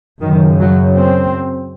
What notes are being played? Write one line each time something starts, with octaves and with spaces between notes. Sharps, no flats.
F#2 D#3
C#3
F#3
C4